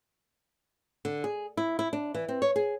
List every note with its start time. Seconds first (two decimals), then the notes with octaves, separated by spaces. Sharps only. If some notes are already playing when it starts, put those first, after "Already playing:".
1.05 D3
1.24 G#4
1.57 E4
1.79 E4
1.93 D4
2.14 E3
2.28 C4
2.42 C#5
2.56 G#4